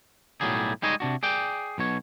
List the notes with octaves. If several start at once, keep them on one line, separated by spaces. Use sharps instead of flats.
B1 A2 F#3 G3 G#4
G3 G#3 D#4 G#4 C#5 D#5
C3 D4 F#4
G#4 D5 G5
B1 B2 C#5